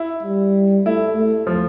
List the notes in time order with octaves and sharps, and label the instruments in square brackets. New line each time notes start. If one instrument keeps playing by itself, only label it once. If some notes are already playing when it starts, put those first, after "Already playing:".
Already playing: [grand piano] E4
[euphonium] G3
[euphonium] A3 [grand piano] E4
[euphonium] A3
[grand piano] F3